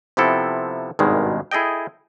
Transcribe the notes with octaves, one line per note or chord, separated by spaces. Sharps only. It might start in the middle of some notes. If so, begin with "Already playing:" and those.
C3 F3 B3 C4 E4 A4
G#1 G2 B2 D#3 G#3
E4 G#4 A4 D#5 G5